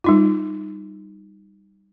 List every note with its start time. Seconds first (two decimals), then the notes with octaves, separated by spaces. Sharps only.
0.04 G3 D#4 F4